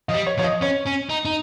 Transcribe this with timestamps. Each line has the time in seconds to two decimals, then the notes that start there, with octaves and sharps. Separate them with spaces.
0.08 F3 D#5
0.14 G3
0.27 C#5
0.38 F3 C#5
0.44 D#5
0.62 C#4 C#5
0.87 C#4
1.10 D#4
1.25 D#4